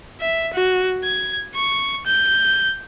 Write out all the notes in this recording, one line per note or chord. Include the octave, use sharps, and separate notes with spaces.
E5
F#4
G#6
C#6
G6